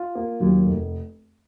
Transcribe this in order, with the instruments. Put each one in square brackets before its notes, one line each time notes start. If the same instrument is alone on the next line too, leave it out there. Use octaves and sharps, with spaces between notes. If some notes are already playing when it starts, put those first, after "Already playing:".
Already playing: [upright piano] F4
A#3
[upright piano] D#2 [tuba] F#3
[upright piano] F1